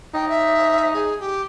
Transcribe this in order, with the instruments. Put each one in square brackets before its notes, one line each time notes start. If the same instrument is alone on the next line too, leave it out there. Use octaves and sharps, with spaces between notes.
[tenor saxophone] D#4 [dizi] G5
[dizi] E5
G#4
G4